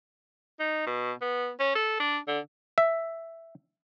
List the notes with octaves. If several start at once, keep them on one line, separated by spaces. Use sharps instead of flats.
D#4
B2
B3
C#4
A4
D4
D3
E5